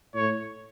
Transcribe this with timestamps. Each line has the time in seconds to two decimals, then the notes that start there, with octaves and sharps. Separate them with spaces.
0.15 A2 C#5